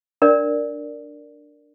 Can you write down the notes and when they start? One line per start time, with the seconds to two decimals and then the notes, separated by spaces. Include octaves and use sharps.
0.22 D4 A#4 D5